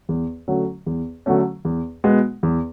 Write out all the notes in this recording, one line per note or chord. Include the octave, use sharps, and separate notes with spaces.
E2
D3 F#3 A3 C#4
E2
D3 F#3 A3 C#4
E2
B2 G#3 B3
E2